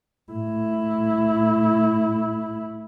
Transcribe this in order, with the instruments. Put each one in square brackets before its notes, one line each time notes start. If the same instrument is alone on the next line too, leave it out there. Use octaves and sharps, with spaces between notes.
[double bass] A2 E4